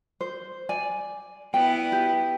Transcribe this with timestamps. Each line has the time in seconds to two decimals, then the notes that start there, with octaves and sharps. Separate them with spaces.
0.21 C5
0.69 D5 G#5
1.54 B3 E4 D5 G5
1.92 G4